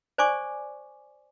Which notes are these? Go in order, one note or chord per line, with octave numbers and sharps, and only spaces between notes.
C5 D5 G#5 C#6 D6